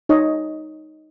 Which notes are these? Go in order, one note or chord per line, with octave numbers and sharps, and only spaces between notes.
D#4 C#5 D#5